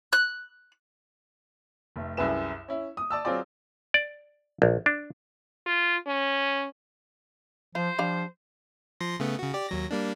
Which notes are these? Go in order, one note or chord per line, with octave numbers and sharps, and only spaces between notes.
F#6
F1 A3
C2 F#2 E4 G#4 B4 E7
C#4 E4
D#6
D5 A5 E6
F#3 C4 F4 G#4 D5
D5
A#1
D4
F4
C#4
F3 F4 C5
F3 G3 D4 F5
F3 C6 A#6
C#3 A3 B3
C#3 F#4
G4 D5
D#2 F#3 A#6
G3 A#3 D4